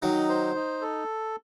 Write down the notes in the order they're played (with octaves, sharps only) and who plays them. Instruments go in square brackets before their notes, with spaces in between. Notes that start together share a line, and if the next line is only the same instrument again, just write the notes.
[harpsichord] D#3 F#3 [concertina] D#4
[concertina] C5
D#4
A4